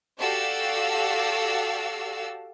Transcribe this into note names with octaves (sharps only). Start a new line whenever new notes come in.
F#4 G4 A4 D5 F5 E6